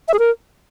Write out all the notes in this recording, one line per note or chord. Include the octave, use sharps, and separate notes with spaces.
E5
G#4
A#4